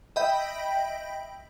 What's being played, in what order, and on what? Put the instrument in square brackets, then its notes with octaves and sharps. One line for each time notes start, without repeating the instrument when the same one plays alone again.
[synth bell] D#5 E5 G5 B5 G6